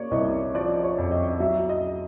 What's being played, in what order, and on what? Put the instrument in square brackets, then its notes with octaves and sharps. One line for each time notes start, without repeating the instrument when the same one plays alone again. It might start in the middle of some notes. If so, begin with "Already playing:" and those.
Already playing: [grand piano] A#3 [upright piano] C#5 D5
[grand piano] C2 [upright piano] D#5
[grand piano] F3 [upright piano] D5
[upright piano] C#5
[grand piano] F2
[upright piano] D#5
[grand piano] F#3 [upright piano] E5
[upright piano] D#5